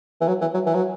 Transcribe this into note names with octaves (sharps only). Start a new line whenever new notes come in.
E3
F#3
E3
F#3
E3
F#3